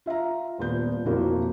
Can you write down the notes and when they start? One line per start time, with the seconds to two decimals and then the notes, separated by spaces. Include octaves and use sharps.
0.06 F4 E5 F5 A#5
0.58 D#1 A#2 B3 G6
1.05 B1 F2 A#3 E4 F#4 A#4